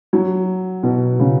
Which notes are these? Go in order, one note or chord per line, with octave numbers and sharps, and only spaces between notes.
F#3
B2
C#3